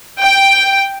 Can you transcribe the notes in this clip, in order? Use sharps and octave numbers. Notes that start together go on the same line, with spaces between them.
G5